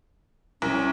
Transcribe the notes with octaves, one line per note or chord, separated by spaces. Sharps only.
C2 C#4